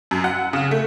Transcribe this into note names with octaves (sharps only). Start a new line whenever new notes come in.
F#2
F#5
C#3
A3